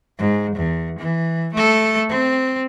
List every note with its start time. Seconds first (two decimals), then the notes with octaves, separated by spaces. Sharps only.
0.18 G#2
0.55 E2
0.99 E3
1.53 A3 A4
2.09 C4